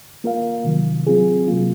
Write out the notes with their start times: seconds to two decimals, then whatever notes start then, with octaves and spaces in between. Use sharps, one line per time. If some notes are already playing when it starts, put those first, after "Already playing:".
0.24 A#3 F4 A#4 F5
0.64 C3 D#3 F#3
1.07 F#3 C4 F4 G#4
1.48 C3 F#3 A#3 F4